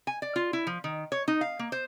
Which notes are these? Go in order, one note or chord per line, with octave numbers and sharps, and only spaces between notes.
G#5
D5
F4
E4
F3
D#3
C#5
D#4
F5
A#3
C5